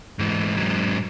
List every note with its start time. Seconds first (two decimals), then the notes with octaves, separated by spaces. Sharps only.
0.19 G#2 E3
0.57 G#2 F#3